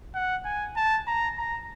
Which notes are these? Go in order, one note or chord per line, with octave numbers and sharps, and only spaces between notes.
F#5
G#5
A5
A#5
A#5